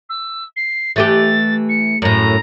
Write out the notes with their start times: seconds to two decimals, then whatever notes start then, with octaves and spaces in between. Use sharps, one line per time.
0.09 E6
0.56 C7
0.96 E3 A3 G4 A6
1.69 C#7
2.02 F#2 A2 A#5